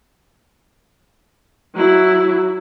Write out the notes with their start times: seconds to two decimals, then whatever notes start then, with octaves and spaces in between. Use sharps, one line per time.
1.75 F#3 E4